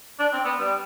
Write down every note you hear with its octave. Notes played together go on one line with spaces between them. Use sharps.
D4
C4
B3
G3